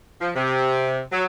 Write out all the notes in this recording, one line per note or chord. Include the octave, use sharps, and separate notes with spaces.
F3
C3
F#3